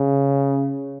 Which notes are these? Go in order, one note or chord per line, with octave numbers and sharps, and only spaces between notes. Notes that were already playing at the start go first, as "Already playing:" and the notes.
Already playing: C#3